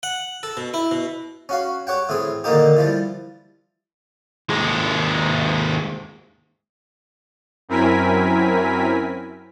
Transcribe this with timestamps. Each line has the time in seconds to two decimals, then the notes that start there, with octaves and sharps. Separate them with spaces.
0.03 F#5
0.43 A4
0.57 B2
0.74 E4
0.91 B2
1.49 C#4 F#4 F5
1.87 G4 C#5 F#5 G5
2.09 A2 E3 C4 G#4
2.44 A#2 D3 D#3 A#3 D#4 G4
2.77 E3 F3 G3
4.50 D#2 G#3
7.69 F#2 C4 E4 A#4 G#5 B6